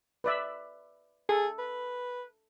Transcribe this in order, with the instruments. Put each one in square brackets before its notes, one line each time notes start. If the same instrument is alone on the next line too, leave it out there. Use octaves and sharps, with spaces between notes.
[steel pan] B4 D5 E5
[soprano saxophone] G#4 [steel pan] A4
[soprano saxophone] B4